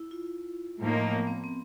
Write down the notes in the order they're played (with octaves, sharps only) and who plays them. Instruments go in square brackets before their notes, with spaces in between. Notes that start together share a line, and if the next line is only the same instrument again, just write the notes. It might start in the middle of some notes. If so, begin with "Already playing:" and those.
Already playing: [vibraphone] E4
F4
[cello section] A2 F3 A#3 D#4
[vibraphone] B3
C4
C4